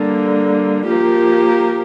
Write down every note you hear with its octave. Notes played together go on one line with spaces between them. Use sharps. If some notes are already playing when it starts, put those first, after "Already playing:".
Already playing: D3 G3 A#3
F3 A#3 G4 A#4